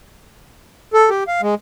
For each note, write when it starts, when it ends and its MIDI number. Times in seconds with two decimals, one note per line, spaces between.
0.94 1.10 69
1.10 1.24 67
1.28 1.41 77
1.42 1.55 56